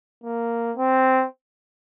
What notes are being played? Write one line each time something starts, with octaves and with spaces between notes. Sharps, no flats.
A#3
C4